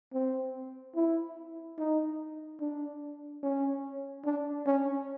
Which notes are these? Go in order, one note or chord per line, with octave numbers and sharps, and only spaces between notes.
C4
E4
D#4
D4
C#4
D4
C#4